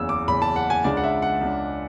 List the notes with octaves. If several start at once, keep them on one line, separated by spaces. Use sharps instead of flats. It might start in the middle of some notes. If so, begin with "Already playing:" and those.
Already playing: F#1 E2 C#3 E6
D6
F#1 E2 C#3 B5
A5
F#5
G#5
C#2 C#3 G#3 D4 D5
F#5
E5
F#5
C#2 C#3 G#3 D4